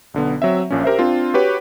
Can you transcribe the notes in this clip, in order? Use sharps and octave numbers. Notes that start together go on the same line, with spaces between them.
B1 D3 B3
F#3 C4 E5
A#1 A#2 C#4
G4 A#4 C5 E5
C4 D4 F4
F#4 G4 B4 C#5